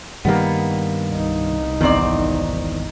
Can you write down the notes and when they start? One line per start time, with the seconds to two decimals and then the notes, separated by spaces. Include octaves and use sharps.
0.25 G2 D#3 G3 A#3 B3
1.09 C2 D#4
1.81 G#1 E2 D#3 C4 D5